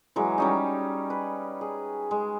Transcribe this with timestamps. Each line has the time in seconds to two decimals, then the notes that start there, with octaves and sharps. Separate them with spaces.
0.16 E3 F#3 G#3
0.38 G3 C#4 D#4
1.10 B4
1.61 G#4
2.11 G#3